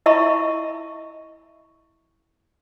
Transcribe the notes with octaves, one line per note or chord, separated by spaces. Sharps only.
E4 D#5 E5 A5 B5 C#6